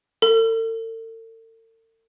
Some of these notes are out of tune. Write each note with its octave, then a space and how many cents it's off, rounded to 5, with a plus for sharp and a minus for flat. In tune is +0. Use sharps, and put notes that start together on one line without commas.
A4 +45